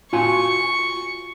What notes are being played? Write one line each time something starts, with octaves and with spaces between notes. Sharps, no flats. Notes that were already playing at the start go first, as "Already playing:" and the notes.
F4 F#4 G#5 C#6